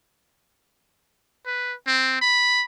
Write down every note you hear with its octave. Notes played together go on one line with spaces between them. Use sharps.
B4
C4
B5